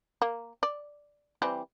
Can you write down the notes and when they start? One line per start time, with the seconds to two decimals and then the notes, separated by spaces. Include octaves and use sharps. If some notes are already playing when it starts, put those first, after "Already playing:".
0.22 A#3
0.63 D5
1.42 E3 G3 C4